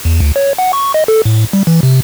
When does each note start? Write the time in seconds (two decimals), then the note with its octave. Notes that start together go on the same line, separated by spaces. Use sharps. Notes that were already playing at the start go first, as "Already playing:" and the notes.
0.05 E2
0.20 D2
0.36 C#5
0.58 F#5
0.73 C#6
0.94 D#5
1.08 A4
1.25 A2
1.53 G3
1.67 E3
1.83 C3